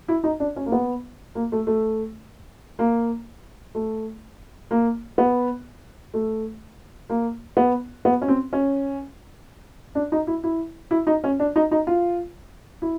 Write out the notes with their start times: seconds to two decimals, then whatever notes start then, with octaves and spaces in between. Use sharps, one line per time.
0.08 E4
0.24 D#4
0.40 D4
0.56 C#4
0.66 A#3
0.72 B3
1.35 A#3
1.52 A3
1.67 A3
2.79 A#3
3.75 A3
4.71 A#3
5.18 B3
6.14 A3
7.10 A#3
7.57 B3
8.05 B3
8.22 C#4
8.28 C4
8.53 C#4
9.95 D4
10.12 D#4
10.27 E4
10.44 E4
10.91 E4
11.07 D#4
11.24 C#4
11.40 D4
11.56 D#4
11.71 D#4
11.87 F4
12.82 E4